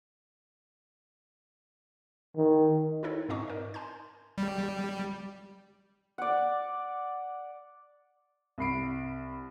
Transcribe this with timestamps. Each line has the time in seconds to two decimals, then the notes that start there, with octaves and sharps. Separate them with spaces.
2.36 D#3
3.03 D#4 E4 A4 C#5
3.29 G#2 C4 D#4 D#5 G#5 C#6
3.48 A#4 D5
3.74 G#5 C6 G6
4.38 G3
6.18 D5 F#5
8.58 C2 B5 C7 D7